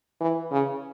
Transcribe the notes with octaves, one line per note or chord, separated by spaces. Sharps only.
E3
C#3